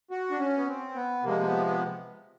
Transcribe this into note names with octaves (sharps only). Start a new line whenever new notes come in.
F#4
D4
C#4
B3
C4
B3
C3 F3 G#3 A#3
A#3
B3
B3